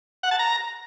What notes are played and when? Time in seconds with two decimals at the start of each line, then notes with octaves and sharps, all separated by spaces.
0.23 F#5
0.31 A5
0.39 A#5